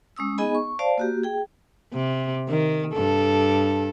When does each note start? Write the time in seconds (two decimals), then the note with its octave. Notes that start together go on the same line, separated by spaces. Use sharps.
0.16 G#3 C#4 D#6 E6
0.38 B3 D#4 G#4 D#5 G#5 B5
0.55 C#6
0.79 C5 D5 F5 A5
0.98 A#3 F#4 G4
1.23 G#4 G5
1.93 C3
2.48 D#3
2.94 G2 A4